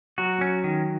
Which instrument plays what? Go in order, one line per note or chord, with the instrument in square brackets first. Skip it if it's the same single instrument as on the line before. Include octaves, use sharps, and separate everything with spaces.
[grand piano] F#3 [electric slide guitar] F#4
[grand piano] F#3 [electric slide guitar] C#4
[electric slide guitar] D#3